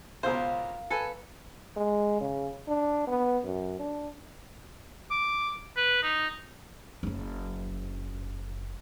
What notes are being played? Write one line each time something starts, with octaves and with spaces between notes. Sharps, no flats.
C#2 B2 A#4 C5 F5
A4 B4 G#5
G#3
C#3
D4
B3
F#2
D4
D6
B4
D#4
F#1 C#4